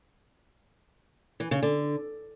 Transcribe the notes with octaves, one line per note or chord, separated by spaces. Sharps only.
E3
C#3
D3